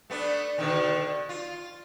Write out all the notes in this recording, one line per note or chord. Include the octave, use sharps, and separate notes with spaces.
A3 B3 D4
B2 D3 D#3
F4